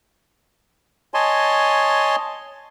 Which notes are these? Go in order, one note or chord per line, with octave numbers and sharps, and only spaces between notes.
C#5 D#5 G#5 A5 C6